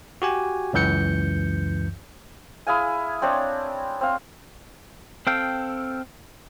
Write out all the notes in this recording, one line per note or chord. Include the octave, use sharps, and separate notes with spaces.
F#4 G4 G#5
C#2 F#2 E3 G6 C#7
E4 G#4 F5 G#5
C4 D4 C#5 D5
C4 F5
C4 A4 F5 G5